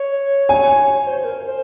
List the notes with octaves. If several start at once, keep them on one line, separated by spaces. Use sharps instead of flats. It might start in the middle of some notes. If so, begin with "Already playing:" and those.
Already playing: C#5
G#5
C5
A#4
C5